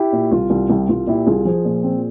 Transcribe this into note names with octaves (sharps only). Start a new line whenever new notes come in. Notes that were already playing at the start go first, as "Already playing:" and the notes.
Already playing: E4 G4
A#2
C2 F4
C2
C2 E4 G4
C2 F4
A#2 E4 G4
C2 F4 G#4
F3 G#4 C5
A#2
C4